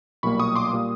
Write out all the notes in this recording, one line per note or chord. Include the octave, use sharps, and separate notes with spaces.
B1 A#2 G3 A#3 B5 C#6
C#6 D#6
C6 D6
A#2 G3 A#3